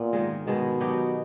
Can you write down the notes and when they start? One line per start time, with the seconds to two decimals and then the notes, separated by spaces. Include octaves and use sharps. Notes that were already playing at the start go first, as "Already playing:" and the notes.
Already playing: A#2 B3
0.13 G#2 D#3 G#3
0.47 G#2 B2 D#3 G#3
0.80 F#3 B3 D#4 G4